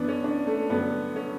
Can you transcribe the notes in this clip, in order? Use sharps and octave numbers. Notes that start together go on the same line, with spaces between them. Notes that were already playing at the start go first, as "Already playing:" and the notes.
Already playing: F#2 E3 B3 D4
C#4
D4
A3
G2 D3 F#3 B3
C#4